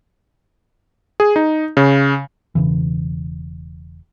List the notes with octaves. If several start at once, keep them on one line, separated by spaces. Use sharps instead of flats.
G#4
D#4
C#3
E1 C#2 C#3 E3